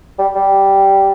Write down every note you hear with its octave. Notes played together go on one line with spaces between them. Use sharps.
G3
G3